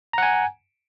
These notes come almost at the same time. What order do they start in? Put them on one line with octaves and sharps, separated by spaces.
A#5 F#5 G#5